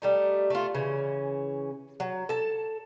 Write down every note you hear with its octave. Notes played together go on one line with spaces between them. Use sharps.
G3 A3 D#4
A3 F4
C#3 E3 C#4
F#3
A4 A5